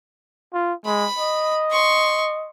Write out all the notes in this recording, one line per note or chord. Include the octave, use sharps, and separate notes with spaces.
F4
G#3 B5
D#5
C6 C#6